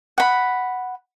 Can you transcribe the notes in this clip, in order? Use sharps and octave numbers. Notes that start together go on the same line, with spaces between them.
F#5 B5